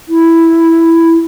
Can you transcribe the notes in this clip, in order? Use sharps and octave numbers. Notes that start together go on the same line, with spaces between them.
E4